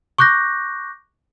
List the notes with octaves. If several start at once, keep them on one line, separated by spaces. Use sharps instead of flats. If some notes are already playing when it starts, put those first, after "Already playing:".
C#6 D6 F#6 G6 A#6